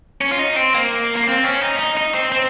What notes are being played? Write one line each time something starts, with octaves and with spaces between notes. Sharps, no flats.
C#4
F4
D#4
C4
A#3
A#3
C4
C#4
D#4
D#4
D#4
C4
C4